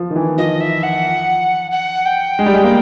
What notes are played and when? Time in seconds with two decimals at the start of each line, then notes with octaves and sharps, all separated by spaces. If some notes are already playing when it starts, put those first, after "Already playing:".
Already playing: F3
0.11 D#3
0.16 E3
0.37 F3 D#5
0.60 E5
0.83 F#5
1.71 F#5
2.05 G5
2.39 G#3
2.46 G3
2.54 G#3
2.64 A#3